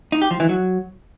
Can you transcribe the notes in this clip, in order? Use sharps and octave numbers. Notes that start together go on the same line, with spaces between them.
D#4
G4
F3
E3
F#3